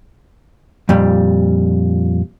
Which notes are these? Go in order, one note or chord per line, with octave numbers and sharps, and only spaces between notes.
F2 A#2 G3